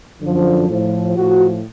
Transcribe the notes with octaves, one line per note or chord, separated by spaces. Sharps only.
F#2 D3 F3
A2 F3
A2 F3 F#4